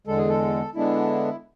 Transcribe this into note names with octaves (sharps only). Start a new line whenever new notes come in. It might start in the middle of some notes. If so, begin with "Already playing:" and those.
E2 D3 G#3 A4
G#4
A4
D3 G#3 B3 D4 E4